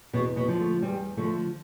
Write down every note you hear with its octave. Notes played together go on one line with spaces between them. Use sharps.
E2 B2 B3
B2 B3
D3 F3
A3
E2 G3
D3 F3 A3